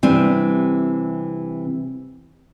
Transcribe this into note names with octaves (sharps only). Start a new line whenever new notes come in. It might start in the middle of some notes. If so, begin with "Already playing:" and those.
C3 E3 G3 C4 D4